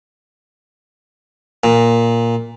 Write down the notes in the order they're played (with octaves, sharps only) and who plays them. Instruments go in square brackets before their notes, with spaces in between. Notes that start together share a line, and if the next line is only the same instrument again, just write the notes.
[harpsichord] A#2